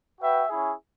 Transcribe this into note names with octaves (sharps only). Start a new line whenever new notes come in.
F#4 B4 E5 G5
C#4 E4 G#4